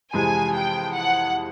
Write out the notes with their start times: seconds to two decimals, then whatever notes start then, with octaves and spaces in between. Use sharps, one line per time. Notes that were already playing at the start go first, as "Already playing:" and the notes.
0.13 F2 C3 E3 G#3 G#5
0.54 G5
0.94 F#5